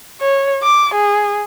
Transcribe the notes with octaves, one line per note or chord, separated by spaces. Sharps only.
C#5
D6
G#4